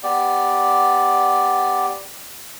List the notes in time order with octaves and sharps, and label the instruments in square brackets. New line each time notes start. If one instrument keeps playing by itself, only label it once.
[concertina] B3 G4 D5